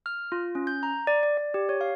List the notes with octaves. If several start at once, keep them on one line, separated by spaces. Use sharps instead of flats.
F6
F4
C#4
G6
A#5
D5
D5
D5
G4
C#5
F5